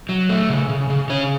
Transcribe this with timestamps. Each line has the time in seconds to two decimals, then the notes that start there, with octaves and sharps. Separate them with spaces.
0.09 F#3
0.29 A3
0.49 C#3
0.69 C#3
0.90 C#3
1.09 C#3 C#4 C#5